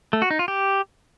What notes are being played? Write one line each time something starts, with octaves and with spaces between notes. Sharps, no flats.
A3
F#4
D#4
F4
G4